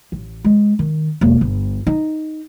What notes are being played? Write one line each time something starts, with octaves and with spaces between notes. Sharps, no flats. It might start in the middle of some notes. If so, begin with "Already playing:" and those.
A1
G#3
D#3
E1 A#3
G1
D#4